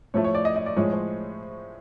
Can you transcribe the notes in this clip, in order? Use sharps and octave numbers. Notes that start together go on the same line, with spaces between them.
A2 F3 A3 C#5
C#5
D5
D#5
D#5
D5
A2 F3 G#3 C#5
C5